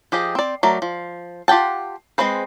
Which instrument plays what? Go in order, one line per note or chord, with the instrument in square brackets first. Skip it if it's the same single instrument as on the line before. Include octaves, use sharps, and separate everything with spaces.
[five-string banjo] F3 G4 G#4 D#5
C4 D5
F#3 A3 A#4 D5
F3
F4 G4 F#5 G5 A5
G#3 C4 G#4 B4 C5